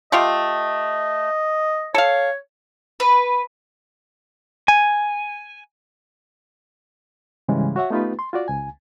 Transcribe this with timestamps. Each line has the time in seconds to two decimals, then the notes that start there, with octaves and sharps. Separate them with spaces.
0.12 A3 F4 G4 D#5
1.94 A4 C#5 F5
3.00 B4
4.68 G#5
7.48 G#2 C#3 E3 G3 G#3
7.76 F#4 C#5 E5 F#5
7.90 A3 B3 D#4 F4 G4 B4
8.19 C6
8.33 F4 F#4 D5
8.48 C#2 G#5